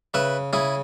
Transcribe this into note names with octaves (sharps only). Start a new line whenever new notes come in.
C#3 B4 E5
C#3 E4 G#4